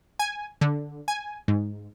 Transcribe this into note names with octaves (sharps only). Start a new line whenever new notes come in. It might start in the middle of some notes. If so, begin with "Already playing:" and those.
G#5
D3
G#5
G#2